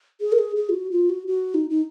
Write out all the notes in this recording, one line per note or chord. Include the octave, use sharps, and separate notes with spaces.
G#4
A#4
G#4
G#4
F4
F#4
F4
F#4
F#4
D#4
D#4